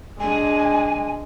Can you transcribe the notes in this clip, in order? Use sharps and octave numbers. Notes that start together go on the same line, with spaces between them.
G#3 D4 G#5